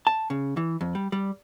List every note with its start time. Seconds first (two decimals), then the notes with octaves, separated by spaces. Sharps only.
0.07 A5
0.30 C#3
0.57 E3
0.81 F2
0.95 G3
1.12 G3